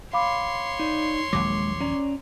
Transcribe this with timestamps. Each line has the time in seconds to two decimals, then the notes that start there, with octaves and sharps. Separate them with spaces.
0.13 C#5 F5 B5 C6 D6
0.80 D#4 D5
1.33 A#1 D#2 F#3 G#3 D6
1.80 C#4 D5 A#5